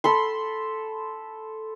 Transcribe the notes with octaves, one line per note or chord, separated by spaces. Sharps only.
A4 B5 C6